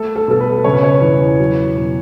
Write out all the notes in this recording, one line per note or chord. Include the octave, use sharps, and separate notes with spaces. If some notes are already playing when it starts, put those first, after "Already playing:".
Already playing: A3 A4
A4
B2 A4
B4
C#3 C#5
B4
C#5
E2
F#3
B2